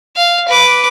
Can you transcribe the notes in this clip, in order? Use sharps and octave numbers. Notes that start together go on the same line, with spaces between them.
F5
B4 D6